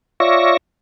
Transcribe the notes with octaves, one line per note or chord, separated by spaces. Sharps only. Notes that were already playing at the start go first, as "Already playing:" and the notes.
F4 C#5 D5 E5 C#6 A#6